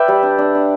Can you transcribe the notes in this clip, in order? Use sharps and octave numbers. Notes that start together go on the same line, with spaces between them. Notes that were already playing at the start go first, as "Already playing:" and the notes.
Already playing: B4 D5 E5 G5
G3
D4
D4
D4